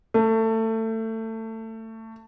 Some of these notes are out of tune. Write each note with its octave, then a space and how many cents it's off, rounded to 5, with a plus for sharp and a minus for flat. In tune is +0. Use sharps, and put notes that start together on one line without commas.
A3 +25